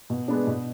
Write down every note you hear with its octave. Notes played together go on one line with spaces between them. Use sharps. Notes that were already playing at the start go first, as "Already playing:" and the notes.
B2
G#3 B3 D4
B2